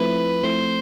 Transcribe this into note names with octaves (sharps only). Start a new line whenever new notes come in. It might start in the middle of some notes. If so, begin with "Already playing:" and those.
Already playing: F3 A3 C4 E4 B4
F3 A3 C4 E4 C5